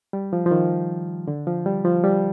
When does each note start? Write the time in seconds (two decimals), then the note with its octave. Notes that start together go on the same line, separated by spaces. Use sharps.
0.13 G3
0.33 F3
0.46 F3
0.51 D#3
1.28 D3
1.47 F3
1.66 G3
1.85 F3
2.04 G3